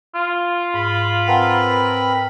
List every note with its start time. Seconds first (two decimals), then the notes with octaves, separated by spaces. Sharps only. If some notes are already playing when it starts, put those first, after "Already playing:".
0.15 F4
0.74 G#2 B5
1.28 C4 A#4 B4 F#5 A5